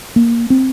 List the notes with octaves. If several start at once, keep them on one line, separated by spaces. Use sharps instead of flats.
A#3
C4